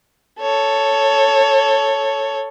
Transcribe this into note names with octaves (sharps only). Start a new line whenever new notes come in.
A4 C#5